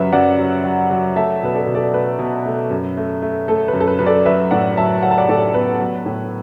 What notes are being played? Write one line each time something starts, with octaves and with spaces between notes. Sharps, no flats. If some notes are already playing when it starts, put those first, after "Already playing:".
Already playing: F#2 F#3 B4 E5
F#2 D5 F#5
F#3
F#3
F#3
A3 E5 A5
B2 B4
A4 D5
B2
A4 D5
A3 B4
B2
A3
F#2
A3
A3
A3 A4
B4
F#2
A4
B4
F#2 B4
A4 D5
F#3 B4 E5
A2 D5 F#5
F#3 E5 A5
F#3 F#5
A5
D5 F#5
A2 A4 D5
B3 B4
F#3
A2